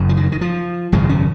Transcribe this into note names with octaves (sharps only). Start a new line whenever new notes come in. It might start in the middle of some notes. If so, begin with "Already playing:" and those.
Already playing: F#1 F#2 C#3
F3
D#3
D#3
F3
G#1 F#2 C#3 G#3
C#4